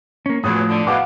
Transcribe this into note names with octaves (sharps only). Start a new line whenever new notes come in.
A#3 C#4
E2 A2 F3 F#3 D#6
D3
B2 E3 F5 F#5 D6